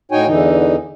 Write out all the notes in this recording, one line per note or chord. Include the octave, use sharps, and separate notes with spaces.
A2 D#4 F#4 C#5 G5 G#5
E2 D3 E3 D#4